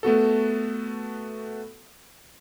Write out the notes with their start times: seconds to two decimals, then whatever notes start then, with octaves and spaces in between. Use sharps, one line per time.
0.03 A3 B3 F#4 A4